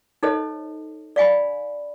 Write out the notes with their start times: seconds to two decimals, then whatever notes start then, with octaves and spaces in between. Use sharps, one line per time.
0.23 D#4 A4 C5 C#5 D#5
1.16 D5 F5 G#5 B5